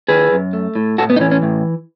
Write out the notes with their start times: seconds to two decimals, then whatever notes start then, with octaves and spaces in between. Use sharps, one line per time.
0.08 D#3 G#4 B4
0.32 F#2
0.53 A3
0.75 A2
0.98 A2 F#4 A4
1.10 B3
1.16 D#4
1.20 E3 C#4
1.31 C#4
1.43 A2